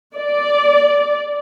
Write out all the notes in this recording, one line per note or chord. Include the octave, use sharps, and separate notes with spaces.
D5